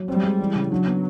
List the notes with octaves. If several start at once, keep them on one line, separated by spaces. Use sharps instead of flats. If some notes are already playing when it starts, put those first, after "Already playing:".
Already playing: F#3
G3 C4
G#3
E3
C#3
F#3 D4
B3